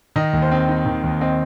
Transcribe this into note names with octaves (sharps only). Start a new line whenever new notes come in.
D#3 D#5
D#2
C5
C4
D#4
D#3
D#2
C4 D#5